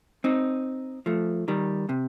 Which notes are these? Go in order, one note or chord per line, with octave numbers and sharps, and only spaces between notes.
C4 D#4
F3 A3
D#3 G3
C3